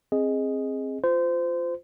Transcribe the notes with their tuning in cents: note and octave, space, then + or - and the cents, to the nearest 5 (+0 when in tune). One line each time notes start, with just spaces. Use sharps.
C4 +20 G#4 +0 D#5 +0
F4 +0 C5 -25